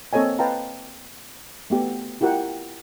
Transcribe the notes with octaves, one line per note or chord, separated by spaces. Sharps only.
A#3 C4 A4 C#5 D#5 G#5
B4 D#5 F5 G5 A5 A#5
A3 B3 G4 A4
E4 F4 G4 A#4 F#5 G5